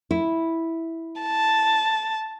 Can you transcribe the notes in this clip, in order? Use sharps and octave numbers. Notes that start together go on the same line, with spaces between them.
E4
A5